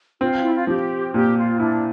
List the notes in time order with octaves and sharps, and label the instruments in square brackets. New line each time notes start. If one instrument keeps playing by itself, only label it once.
[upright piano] C4 [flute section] F4
[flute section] E4
F4
[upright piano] F3 [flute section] G4
[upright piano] A#2 [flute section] G4
[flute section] F4
[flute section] D4 [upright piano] E4